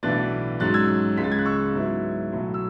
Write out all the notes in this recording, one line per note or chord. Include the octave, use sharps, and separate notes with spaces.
B1 A2 E3 B3 D4 F#6 A6
G#2 F#3 C#4 F#6 A6
E6 G#6
C#2 C#3 G#3 B6
A6
G#6
F#6
C#6 E6
G#2 F#3 B3 E4
B1 A2 F#3
E6